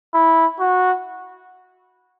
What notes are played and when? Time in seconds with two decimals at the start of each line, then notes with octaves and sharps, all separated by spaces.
0.14 E4
0.60 F#4